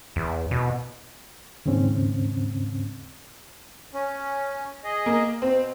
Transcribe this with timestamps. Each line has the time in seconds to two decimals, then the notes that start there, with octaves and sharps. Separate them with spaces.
0.16 E2
0.51 B2
1.66 D#2 G#2 C#3 C4 C#4
3.94 C#4
4.84 G#4 D#5
5.06 A#3
5.42 B2 C4